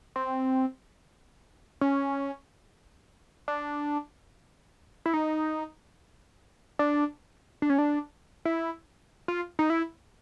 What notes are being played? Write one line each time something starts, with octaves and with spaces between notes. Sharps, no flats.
C4
C#4
D4
E4
D#4
D4
D4
C#4
D4
E4
F4
D#4
E4